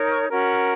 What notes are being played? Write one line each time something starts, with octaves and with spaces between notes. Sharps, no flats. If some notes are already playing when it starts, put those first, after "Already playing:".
Already playing: D#4 A#4 C#5
C#6 F6
C#4 F#4 A#4